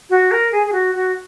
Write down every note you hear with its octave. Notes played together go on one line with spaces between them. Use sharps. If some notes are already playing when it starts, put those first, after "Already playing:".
F#4
A#4
G#4
G#4
F#4
F#4